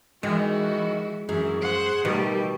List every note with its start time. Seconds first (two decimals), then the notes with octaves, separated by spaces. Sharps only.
0.23 D#3 E3 G#3 F#4
1.29 F#2 E3 G#4
1.62 C5 F#5
2.05 B2 D#3 G3 A3 G4